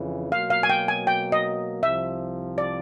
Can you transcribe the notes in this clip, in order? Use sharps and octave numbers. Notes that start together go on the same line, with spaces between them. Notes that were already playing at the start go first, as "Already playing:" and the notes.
Already playing: F2 C#3 E3
B2 F#3 A#3 F5
F5
G#5
G5
G#5
G5
D#5
C2 C3 F3 E5
D5